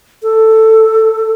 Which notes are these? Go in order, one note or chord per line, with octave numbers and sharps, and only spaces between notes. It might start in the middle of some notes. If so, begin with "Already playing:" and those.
A4